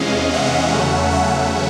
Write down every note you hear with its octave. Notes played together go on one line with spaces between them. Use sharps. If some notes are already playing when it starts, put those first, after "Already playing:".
Already playing: E2 C3 E3 G#3 C#4 D#5 F5
E5 F#5
E2 C#3 F#3 A3 C#4
E5 F#5